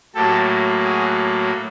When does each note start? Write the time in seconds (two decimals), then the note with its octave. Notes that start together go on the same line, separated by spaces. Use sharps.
0.15 A2 F#3 A#3 G4 A4
0.84 F#4 G#4